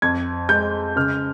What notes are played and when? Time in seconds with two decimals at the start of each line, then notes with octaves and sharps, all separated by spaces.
0.02 F2 G#6
0.49 G#3 G6
0.96 C#3 F6